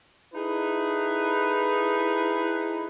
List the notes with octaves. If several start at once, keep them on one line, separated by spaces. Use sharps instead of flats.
D#4 E4 G#4 A4 B4